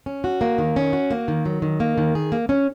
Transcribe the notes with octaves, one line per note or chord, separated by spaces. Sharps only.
C#4
F#4
A#3
D#3
C#4
F#4
A#3
D#3
F#3
D#3
A#3
D#3
G#4
A#3
C#4